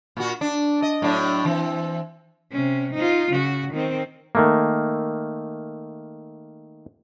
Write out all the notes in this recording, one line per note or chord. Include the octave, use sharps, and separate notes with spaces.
A#2 F#4
D4
D#5
A2 F#3 D4
E3 C4
C3 C#4
D#4 F4
C#3 F#4
D#3 C4
D#3 A3 A#3